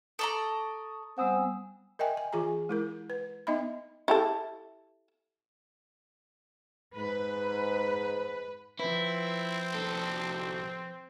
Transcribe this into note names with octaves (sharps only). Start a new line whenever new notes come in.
A4 D5 A#5 C#6 D#6
G3 B3 C4 F#5 G#5 D#6 E6
A#4 D#5 E5 G5 G#5
G#5
E3 F4 G#4 G#5 A#5
G#3 E4 A#4
B4
B3 D#4 D#5 E5 B5
E4 G4 A4
G#2 B4
F3 C4 E4 B4
C2 A4